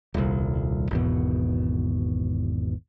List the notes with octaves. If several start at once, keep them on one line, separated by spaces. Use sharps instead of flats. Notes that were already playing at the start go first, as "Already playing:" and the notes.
D#1 C2
G#1 E2 B2